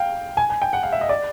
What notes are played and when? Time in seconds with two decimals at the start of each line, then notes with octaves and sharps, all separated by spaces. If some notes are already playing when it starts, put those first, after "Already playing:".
Already playing: F5 G5
0.37 G#5
0.50 G#5
0.62 G5
0.73 F#5
0.83 F5
0.92 E5
1.01 D#5
1.09 D5